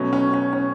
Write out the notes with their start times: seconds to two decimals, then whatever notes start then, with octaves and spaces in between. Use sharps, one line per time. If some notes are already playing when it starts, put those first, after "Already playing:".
Already playing: B2 F#3 A3 C#4
0.13 C#4
0.34 C#4
0.53 C#4